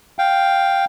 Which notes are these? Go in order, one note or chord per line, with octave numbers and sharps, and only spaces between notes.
F5 G5